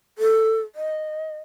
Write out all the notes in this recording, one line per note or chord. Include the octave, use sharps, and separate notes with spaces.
A4
D#5